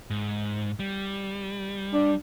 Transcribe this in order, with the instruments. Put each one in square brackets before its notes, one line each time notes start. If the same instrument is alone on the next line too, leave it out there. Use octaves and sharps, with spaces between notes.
[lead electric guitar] G#2
G3
[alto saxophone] D4